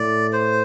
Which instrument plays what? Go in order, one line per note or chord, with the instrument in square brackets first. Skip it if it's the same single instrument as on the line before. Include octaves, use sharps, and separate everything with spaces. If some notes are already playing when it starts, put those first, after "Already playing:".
Already playing: [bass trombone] A2 [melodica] D5
[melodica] C5